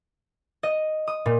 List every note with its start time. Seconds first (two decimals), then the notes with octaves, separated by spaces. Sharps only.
0.63 D#5
1.08 D#6
1.26 A#2